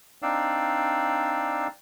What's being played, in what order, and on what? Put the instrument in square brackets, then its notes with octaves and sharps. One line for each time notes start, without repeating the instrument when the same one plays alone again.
[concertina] C4 D4 D#4 D5 F5 E6